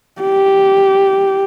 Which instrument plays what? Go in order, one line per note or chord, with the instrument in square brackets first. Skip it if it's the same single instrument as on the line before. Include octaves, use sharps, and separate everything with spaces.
[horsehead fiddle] G4